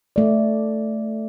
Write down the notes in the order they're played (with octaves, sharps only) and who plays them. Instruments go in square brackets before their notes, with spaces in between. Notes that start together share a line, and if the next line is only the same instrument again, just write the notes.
[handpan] A3 D5